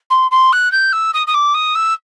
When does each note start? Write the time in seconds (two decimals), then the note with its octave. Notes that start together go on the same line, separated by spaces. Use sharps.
0.10 C6
0.31 C6
0.53 F#6
0.72 G6
0.93 E6
1.14 D#6
1.27 D#6
1.34 D6
1.54 D#6
1.75 E6